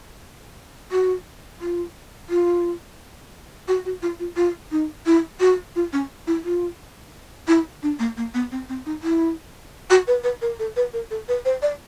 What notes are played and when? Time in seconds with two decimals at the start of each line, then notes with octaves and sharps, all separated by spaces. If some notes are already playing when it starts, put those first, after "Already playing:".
0.92 F#4
1.61 F4
2.29 F4
3.68 F#4
3.85 F#4
4.02 F4
4.20 F4
4.36 F4
4.71 D#4
5.06 E4
5.40 F#4
5.76 F4
5.93 C#4
6.27 E4
6.45 F4
7.48 E4
7.83 D4
7.99 A#3
8.17 A#3
8.34 B3
8.52 C4
8.69 C4
8.86 D#4
9.03 E4
9.90 F#4
10.07 B4
10.24 B4
10.42 A#4
10.59 A4
10.76 B4
10.93 A#4
11.11 A4
11.28 B4
11.45 C5
11.62 D5